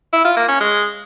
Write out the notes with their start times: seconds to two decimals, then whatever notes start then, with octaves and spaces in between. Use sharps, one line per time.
0.13 E4
0.25 F4
0.36 A#3
0.48 C#4
0.60 G#3